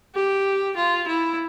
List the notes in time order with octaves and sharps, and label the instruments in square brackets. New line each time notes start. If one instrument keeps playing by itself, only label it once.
[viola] G4
F4
E4